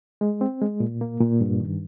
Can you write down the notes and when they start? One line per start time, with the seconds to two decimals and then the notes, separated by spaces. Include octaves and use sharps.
0.21 G#3
0.41 C4
0.62 G#3
0.80 A#2
1.01 A#3
1.20 A#2
1.41 G2
1.60 D#3